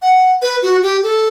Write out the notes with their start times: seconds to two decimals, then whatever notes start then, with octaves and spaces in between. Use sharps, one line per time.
0.02 F#5
0.42 B4
0.62 F#4
0.83 G4
1.03 A4